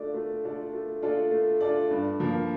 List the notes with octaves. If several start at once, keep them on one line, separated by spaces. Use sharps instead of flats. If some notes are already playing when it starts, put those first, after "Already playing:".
Already playing: A3 D4 F4 A4 D5
A3
D4 F4 A4 D5
A3
D4 F4 A4 D5
A3
D4 F4 A4 D5
G2
F3 A#3